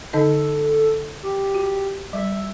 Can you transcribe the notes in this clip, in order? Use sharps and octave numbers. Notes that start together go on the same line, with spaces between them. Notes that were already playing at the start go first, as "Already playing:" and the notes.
D3 D#4 A4 D#5
G4
F#4
G3 E5